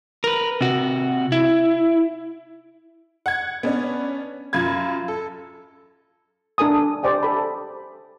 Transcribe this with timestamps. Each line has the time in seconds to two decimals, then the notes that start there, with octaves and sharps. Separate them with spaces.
0.24 A#4 B4
0.61 C3 F#4
1.32 E4
3.26 F#5 G#6
3.63 B3 C#4 D4
4.53 F#2 F4 B5 G#6
5.08 A4
6.58 D4 A4 A#4 G#5 D#6
7.03 G4 C5 D5 G5 G#5
7.23 A4 B5